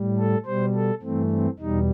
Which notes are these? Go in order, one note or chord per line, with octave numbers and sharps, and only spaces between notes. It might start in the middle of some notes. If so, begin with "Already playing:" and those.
Already playing: A2 G3
A4
B2 G3 C5
A4
G2 E3 A3 C4
C4
E2 B2 G3 D#4